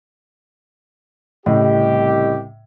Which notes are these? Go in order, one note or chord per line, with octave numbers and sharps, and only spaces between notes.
C2 A2 C#3 G4 D#5